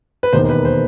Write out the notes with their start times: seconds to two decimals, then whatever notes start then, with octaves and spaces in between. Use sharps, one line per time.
0.23 B4
0.33 E1 D#2 D#3 C5
0.50 B4
0.65 C5